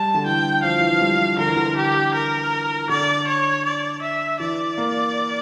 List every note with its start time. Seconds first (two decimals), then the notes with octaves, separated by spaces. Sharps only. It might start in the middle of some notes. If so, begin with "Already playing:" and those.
Already playing: G3 A5
0.15 D3
0.26 E3 G5
0.63 F3 F5
0.81 E3
0.90 F3
1.01 G3
1.38 D3 A#4
1.48 E3
1.57 D3
1.76 G4
2.14 A#4
2.89 D3 D5
3.27 C#5
3.65 D5
4.02 E5
4.40 E3 D5
4.78 A#3